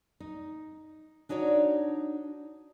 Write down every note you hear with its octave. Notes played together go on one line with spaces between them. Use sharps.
D#4
D4 D#4 F#4 C#5 D5